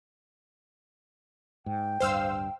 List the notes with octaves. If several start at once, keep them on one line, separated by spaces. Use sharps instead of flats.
G#2 G5
D1 G2 C5 F5 E6